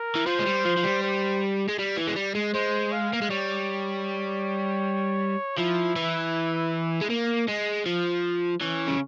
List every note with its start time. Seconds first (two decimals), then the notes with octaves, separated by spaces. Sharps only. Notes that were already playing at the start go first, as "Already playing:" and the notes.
Already playing: A#4
0.15 E3
0.26 F3 C5
0.39 G#3
0.46 G3
0.65 F3
0.77 F3
0.84 G3
1.03 C5
1.69 G#3
1.79 G3
1.97 E3
2.07 G#3
2.16 G3
2.35 G#3
2.54 G#3 C5
2.92 F5
3.13 A#3
3.22 G#3
3.30 G3 C#5
5.58 F3 E4
5.96 E3
7.01 G#3
7.10 A#3
7.48 G#3
7.86 F3
8.61 E3 C#4
8.88 C#3